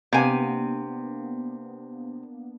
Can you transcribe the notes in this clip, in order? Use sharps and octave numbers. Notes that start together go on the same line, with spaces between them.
C3 A#3 B3 D4 G#5